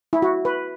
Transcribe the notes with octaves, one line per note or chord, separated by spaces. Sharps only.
E4
F#4
B4